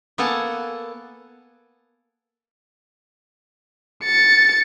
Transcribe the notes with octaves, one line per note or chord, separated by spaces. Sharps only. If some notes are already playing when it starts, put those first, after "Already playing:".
A#3 B3 A4 F#5 G#5 A5
A6 C#7